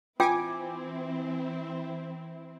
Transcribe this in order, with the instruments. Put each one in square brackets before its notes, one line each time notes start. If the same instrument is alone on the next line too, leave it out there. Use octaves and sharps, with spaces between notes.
[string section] E3 C4 E4 [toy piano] F4 F5 G5 [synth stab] G#5 D6